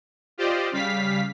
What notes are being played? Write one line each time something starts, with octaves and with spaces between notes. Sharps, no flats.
F4 G4 C5 D5 D#5
C#3 G3 F5 B6